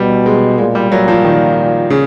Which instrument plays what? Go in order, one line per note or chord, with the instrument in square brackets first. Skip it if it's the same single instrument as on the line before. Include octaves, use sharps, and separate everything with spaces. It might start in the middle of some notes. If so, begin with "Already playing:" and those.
Already playing: [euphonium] B2 [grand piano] G3
[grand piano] G#3
[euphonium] A#2 [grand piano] G#3
[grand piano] G3
[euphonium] A#2 [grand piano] F#3
[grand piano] F3
D#3
C#3